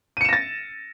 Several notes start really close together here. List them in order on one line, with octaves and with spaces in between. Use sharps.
D#7 C#7 E7 A#6 A6